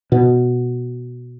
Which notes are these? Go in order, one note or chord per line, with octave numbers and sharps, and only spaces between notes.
B2